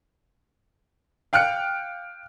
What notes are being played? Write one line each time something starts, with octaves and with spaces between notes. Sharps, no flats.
F5 G5 F6 F#6 C#7